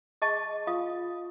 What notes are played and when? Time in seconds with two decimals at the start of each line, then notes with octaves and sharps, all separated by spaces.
0.22 G#4 D#5 A5 C#6
0.67 F4 F5 D#6